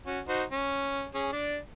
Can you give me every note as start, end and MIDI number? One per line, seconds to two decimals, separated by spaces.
0.06 0.20 61
0.06 0.20 66
0.28 0.44 63
0.28 0.44 66
0.28 0.44 72
0.52 1.06 61
1.15 1.30 61
1.15 1.30 68
1.33 1.57 62
1.33 1.57 74